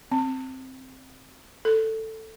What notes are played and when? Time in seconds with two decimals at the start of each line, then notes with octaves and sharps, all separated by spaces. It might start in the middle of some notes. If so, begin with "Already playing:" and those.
0.12 C4
1.65 A4